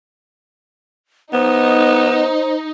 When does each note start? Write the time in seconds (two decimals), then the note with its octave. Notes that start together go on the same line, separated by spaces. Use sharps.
1.33 B3 D#4 C5